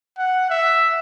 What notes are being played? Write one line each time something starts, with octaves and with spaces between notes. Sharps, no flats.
F#5
E5